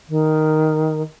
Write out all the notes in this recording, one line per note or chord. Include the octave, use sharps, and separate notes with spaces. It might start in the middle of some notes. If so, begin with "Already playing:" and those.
D#3